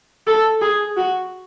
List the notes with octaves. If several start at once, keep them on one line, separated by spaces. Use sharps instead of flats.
A4
G#4
F#4